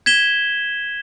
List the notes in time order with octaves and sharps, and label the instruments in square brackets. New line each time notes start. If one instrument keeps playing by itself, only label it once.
[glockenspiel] G#6 B6 E7 G7